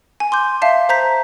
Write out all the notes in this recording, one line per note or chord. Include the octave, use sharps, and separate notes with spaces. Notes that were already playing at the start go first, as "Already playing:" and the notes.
G#5
C6 D6 G6
E5 F5 A5
C5 A#5 G6 B6